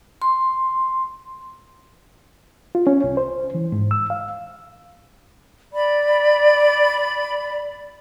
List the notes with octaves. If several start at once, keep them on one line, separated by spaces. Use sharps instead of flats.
C6
F4
C#4
C2
C5
E3
G#2
E6
F5
D5 B5